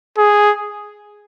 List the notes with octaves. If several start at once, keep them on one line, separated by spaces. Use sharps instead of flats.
G#4